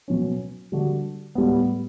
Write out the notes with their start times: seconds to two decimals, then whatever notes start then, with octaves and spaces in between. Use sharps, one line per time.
0.08 B2 F#3 C#4
0.72 D3 G3 D4 F#4
1.35 A2 G3 B3